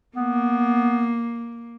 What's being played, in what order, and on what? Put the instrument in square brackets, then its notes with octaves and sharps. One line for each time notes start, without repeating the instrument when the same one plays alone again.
[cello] A#3 [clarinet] B3